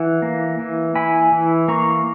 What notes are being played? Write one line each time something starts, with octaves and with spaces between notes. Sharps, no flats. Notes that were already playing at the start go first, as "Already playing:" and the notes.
Already playing: E3 F#5
A#3
E3
E4 G#5 B5
E3
A#3 A#5 C#6